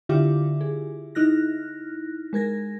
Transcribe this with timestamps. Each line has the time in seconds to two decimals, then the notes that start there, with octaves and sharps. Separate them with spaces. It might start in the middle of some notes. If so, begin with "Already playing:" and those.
0.09 D3 E4 F4 G4 E5 D6
0.61 G#4
1.15 D#4 E4 F6 F#6 A#6
2.33 G#3 A#4 G#6 A#6